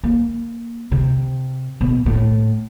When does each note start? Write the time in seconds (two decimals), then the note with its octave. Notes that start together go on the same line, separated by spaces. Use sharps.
0.04 A#3
0.92 C3
1.81 B2
2.06 A2